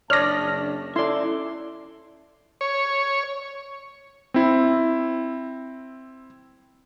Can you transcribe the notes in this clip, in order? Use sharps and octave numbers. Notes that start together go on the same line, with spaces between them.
F#1 D4 C#5 D5 A5 D#6 F6 A#6
C#4 E4 A4 D5 C6
C#5
C4 E4